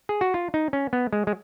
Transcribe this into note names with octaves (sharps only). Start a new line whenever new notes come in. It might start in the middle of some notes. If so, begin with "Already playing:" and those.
G#4
F#4
F4
D#4
C#4
B3
G#3
G#3